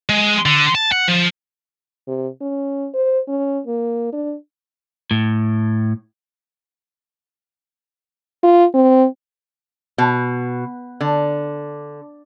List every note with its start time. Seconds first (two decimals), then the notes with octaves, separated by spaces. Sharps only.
0.09 G#3
0.45 D3
0.75 A5
0.92 F#5
1.08 F3
2.07 C3
2.41 C#4
2.94 C5
3.28 C#4
3.67 A#3
4.12 D4
5.11 A2
8.43 F4
8.74 C4
9.98 B2
11.01 D3